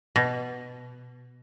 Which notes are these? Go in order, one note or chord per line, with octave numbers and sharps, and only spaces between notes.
B2